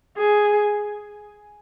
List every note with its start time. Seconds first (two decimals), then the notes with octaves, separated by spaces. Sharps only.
0.17 G#4